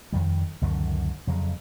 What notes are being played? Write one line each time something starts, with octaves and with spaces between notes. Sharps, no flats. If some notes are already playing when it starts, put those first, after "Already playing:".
F2 D#3 G3
C#2 F#2 D3 D#3
F2 C#3 F#3